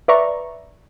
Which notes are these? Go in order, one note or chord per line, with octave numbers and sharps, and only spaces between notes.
B4 D5 E5 A#5 C#6